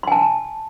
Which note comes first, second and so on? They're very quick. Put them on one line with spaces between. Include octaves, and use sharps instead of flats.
C6 G#5 A5